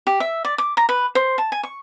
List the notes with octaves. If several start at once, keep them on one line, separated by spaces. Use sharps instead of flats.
G4
E5
D5
D6
A#5
B4
C5
A5
G#5
C#6